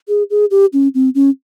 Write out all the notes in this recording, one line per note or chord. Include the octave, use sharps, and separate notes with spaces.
G#4
G#4
G4
C#4
C4
C#4